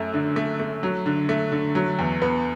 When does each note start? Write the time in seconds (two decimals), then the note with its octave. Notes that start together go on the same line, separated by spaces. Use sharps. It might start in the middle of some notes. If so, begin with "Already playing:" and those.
Already playing: F#2 A3
0.14 D3
0.36 A3
0.60 A3
0.83 F#3
1.06 D3
1.29 A3
1.52 D3
1.75 F#3
1.99 E2
2.22 B3